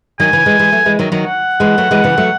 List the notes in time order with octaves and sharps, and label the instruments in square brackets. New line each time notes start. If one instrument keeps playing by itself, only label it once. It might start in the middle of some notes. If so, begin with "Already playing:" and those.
[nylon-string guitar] D#3 F#3 [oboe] G#5
[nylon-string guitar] C#3 E3
E3 G#3
E3 G#3
F#3 A3
E3 G#3
D#3 F#3
D#3 F#3
[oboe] F#5
[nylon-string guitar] E3 G#3
F#3 A3
E3 G#3
C#3 E3
F#3 A3